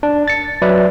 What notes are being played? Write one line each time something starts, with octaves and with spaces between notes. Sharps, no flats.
D4
A6 C#7
F#3 B4 D5 E5